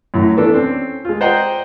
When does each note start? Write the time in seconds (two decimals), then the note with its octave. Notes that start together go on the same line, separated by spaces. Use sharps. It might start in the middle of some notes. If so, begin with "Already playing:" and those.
0.14 F#2 A2
0.36 E3 B3 D4 A4
0.54 C4 C#4
1.05 G#3 F4
1.21 C5 D5 D#5 F#5 G5 A#5